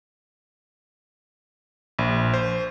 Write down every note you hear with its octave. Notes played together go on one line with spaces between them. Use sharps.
A#1
C5